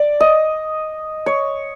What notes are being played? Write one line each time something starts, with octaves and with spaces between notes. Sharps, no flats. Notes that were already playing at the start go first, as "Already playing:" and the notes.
Already playing: D5
D#5
C#5